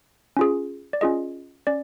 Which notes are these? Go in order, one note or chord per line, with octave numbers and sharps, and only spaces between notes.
C#4 F4 G#4
D5
C#4 F4 G#4 D#5
C#4 D5